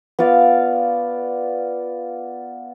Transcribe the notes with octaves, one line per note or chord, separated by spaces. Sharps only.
B3 F4 D5 F5